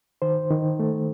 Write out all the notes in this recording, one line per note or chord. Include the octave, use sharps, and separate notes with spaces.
D#3 C5
D#3
A3